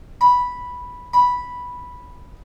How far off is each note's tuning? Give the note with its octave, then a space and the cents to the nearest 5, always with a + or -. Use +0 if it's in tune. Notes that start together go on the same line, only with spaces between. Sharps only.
B5 -5
B5 -5